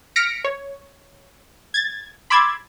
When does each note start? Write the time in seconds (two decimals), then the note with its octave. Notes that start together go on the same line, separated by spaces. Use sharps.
0.16 F6 A#6 B6 C#7 D7
0.44 C#5
1.74 G#6 A6
2.30 B5 C6 D6 E6 G#6 A6